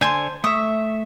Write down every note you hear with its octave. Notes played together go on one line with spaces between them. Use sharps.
D3 C5 G#5 A5 C6
A3 E5 C#6 D#6